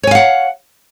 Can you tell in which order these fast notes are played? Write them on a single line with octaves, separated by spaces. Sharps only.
C#5 G#5 F5 F#5